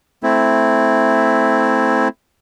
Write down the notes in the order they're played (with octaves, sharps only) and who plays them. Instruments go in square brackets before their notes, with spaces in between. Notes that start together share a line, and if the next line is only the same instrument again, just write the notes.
[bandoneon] A3 C4 E4